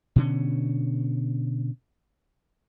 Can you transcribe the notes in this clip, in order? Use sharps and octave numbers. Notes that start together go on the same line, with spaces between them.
B2 D3 C#4